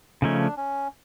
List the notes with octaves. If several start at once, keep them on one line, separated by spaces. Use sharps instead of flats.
C#3 F3 A3 C#4 D#4
D4
C#4